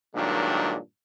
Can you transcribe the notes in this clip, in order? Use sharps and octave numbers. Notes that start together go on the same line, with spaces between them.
G2 A#2 D#3 F#3 G#3 D4